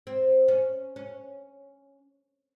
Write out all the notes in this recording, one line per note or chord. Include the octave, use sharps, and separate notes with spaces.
C4
C#4
C#4